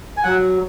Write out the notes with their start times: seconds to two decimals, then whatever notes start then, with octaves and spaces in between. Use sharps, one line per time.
0.17 G#5
0.24 F#3 F#5